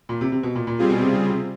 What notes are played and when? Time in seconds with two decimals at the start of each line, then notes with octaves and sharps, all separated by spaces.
0.09 A#2
0.21 C3
0.32 C3
0.43 B2
0.55 A#2
0.67 A#2
0.78 G3 C4 F4 G#4
0.90 B2
1.02 C3
1.13 C#3
1.29 C3